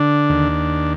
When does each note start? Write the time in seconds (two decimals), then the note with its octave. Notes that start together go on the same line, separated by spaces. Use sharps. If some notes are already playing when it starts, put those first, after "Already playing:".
Already playing: D3 D4
0.29 D#2